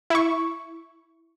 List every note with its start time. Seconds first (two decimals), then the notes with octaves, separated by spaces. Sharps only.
0.10 E4 C#6